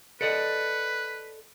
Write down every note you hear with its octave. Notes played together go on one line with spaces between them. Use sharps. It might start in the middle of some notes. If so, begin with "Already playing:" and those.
A4 B4 D5 D#5